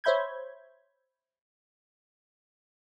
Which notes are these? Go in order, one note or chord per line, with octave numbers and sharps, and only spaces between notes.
C5 C#5 E5 B5 G6 G#6